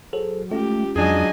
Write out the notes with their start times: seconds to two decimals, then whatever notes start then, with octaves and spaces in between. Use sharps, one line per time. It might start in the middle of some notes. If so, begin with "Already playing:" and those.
0.13 F#3 G#4 A4 C5
0.51 G#3 A3 C#4 F4 G4
0.96 F2 F#3 D4 G#4 D#5 G#5